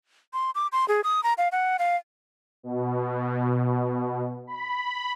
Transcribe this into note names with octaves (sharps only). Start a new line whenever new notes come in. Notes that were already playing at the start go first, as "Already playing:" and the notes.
C6
D6
C6
G#4
D#6
A#5
F5
F#5
F5
B2
B5